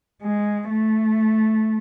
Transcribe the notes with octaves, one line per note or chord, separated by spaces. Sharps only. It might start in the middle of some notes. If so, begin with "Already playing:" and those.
G#3
A3